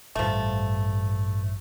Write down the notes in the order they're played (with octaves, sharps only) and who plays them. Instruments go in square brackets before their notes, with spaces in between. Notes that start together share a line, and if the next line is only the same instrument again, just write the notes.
[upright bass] A1 G2 [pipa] F3 A3